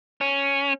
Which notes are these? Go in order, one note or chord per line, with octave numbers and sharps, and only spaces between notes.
C#4